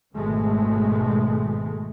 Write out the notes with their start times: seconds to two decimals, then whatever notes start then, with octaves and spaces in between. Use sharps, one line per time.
0.15 G#1 B2 D#3 G#3 A3